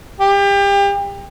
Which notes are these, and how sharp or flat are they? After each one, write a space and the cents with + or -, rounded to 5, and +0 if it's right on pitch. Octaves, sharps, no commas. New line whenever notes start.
G4 +30